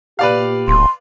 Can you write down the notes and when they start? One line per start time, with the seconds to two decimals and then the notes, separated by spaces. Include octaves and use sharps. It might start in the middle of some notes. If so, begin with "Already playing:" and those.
0.19 A#2 B3 G4 B4 D5 F5
0.68 D1 C6